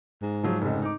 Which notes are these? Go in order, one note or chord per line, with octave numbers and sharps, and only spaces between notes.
G#2
F3 F#3 G#4
F1 C#2
D#4 D6